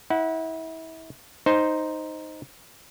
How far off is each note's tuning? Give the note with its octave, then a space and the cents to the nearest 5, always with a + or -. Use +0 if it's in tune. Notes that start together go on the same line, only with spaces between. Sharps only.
E4 -35 F#5 +0
D#4 +0 C5 +0